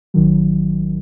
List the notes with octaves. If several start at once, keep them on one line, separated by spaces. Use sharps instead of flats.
A1 D#3 F#3